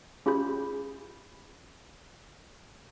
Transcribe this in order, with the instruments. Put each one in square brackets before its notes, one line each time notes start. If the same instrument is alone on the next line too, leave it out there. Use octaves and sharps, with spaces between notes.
[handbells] C#4 F4 G4 G#4 B5 G6